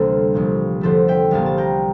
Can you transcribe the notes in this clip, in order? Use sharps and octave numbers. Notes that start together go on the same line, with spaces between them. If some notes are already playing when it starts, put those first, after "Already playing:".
Already playing: D2 C3 E3 G3 A#3 A4 C5
C2 A#2 F3
E2 D3 F3 A3 A4 C5
E5 G5
C2 A#2 G3 A#3 F5 A5
A5
G5 A#5